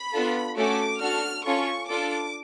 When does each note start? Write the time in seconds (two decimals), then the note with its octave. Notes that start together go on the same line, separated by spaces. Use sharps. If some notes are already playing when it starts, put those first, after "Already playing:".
Already playing: B5
0.13 B3 D4 F4 A4
0.57 A3 C#4 F#4 A4 D6
1.01 D4 F#4 A4 F6
1.45 C#4 F4 A4 C#6
1.89 D4 F4 A4 D6